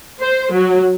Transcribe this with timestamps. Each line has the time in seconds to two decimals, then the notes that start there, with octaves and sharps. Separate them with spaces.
0.20 C5
0.52 F#3